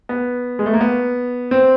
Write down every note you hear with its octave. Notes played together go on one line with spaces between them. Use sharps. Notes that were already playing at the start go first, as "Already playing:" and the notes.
B3
G#3
A3
A#3
B3
C4